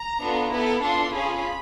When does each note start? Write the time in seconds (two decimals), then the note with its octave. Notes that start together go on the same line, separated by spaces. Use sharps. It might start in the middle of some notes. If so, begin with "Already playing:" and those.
Already playing: A#5
0.21 B3 D4 F4 A4
0.52 B3 E4 A4 B5
0.83 D4 F4 A4 C6
1.13 C#4 F4 G#4 B5